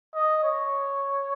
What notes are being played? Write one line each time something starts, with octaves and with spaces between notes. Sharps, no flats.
D#5
C#5